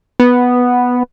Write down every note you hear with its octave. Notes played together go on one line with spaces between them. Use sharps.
B3